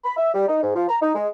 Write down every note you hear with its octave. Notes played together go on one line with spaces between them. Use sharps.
B5
E5
G3
D#4
G#2
F3
A#5
D#4
G#3